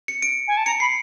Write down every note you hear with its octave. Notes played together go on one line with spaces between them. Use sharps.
C#7
D7
G#5
A5
A#5 C#7
B5 C7